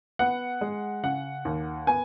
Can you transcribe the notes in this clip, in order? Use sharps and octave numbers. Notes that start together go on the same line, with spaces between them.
B3 F#5
G#3
C#3 F#5
D#2
B3 G#5